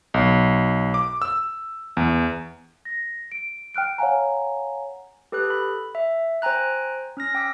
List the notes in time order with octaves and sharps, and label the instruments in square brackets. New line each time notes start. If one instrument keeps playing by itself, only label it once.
[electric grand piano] B1
D6
E6
E2
[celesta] A#6
D7
G5 F6 F#6 D7
C#5 F5 F#5 G#5 A#5
[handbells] G4 A4 B4 D#6 F#6
B5
E5
C5 G5 G#5 A#5 F#6
C#4 F6 A#6
G5 D6 E6 B6